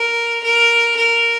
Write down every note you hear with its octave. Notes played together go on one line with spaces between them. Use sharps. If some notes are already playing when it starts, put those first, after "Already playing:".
Already playing: A#4
A#4
A#4